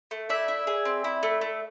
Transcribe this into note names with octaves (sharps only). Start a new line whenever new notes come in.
A3
E4 D5 E5
E4
G#4
C4
E4
A3
A3